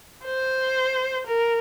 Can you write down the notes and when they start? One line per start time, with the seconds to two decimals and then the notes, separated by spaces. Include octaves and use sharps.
0.25 C5
1.27 A#4